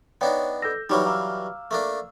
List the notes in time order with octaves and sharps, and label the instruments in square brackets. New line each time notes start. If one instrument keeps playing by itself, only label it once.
[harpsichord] B3 D4 D#4 [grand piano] C#5 [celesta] D5 F5 G5
[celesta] A4 A#6 [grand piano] E6 G6
[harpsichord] E3 F#3 G3 [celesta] D#4 D6 [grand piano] G4 C#5 F6
[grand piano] F5 E6 [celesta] A#5 D6 F6
[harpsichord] A3 A#3 D4